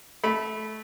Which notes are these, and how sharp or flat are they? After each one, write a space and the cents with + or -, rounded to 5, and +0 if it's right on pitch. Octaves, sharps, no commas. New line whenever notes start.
A3 -20 B5 +0